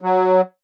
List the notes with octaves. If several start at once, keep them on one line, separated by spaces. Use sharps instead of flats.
F#3